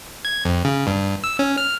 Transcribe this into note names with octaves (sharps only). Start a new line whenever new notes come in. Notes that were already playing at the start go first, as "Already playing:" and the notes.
G#6
F2
C#3
G2
E6
C#4
F6